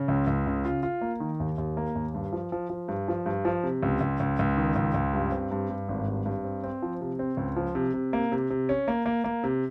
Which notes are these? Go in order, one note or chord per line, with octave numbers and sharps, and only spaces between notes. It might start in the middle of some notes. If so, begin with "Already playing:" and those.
Already playing: C#3
C#2
C#2
C#3
F4
F4
A#3
D#3
D#2
D#2
A#3
D#2
G2
F3
F3
F3
G2
F3
G2
F3
C3
C#2
C#2
C#2
C#2
D#3
C#2
C#2
G2
C4
G2
G2
G#1
G2
G2
C4
C4
F3
C3
C4
C#2
F3
C3
C3
A#3
C3
C3
C#4
A#3
A#3
A#3
C3